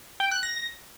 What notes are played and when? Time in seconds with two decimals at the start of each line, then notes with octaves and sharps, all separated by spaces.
0.20 G5
0.31 F#6
0.43 A#6